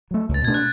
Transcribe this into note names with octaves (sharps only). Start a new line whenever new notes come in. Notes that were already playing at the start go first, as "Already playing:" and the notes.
F#3 A3
C#2
A6
B2 A3 D4 G#6
F#6